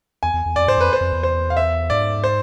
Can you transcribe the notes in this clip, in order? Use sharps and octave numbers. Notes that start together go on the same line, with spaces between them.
E2 G#5
E2
E2
F2 D5
G#2 C5
F2 B4
C5
F2
E2
C5
F5
E5
G#2 D5
C5